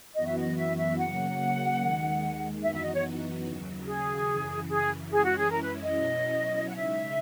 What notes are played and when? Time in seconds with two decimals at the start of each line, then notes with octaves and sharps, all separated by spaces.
0.15 F#2 E3 B3 F#4 D#5
0.26 E5
0.38 D#5
0.56 E5
0.77 E5
0.98 C#3 F#3 A#3 F#5
1.80 D#2 D#3 G#3
2.63 F#2 E3 B3 D#4 F#4 E5
2.73 E5
2.83 D#5
2.94 C#5
3.45 D#2 C#3 F#3
3.86 G#4
4.27 F#2 C#3 E3
4.69 G#4
5.10 F#2 E3 G#3 C#4 E4 G#4
5.24 F#4
5.38 G#4
5.51 A#4
5.62 B4
5.82 D#5
5.93 B2 F#3 C#4 E4
6.68 F#5
6.75 C#3 G#3 D#4 E5